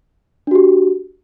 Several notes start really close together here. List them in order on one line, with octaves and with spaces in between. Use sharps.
D4 F#4 G4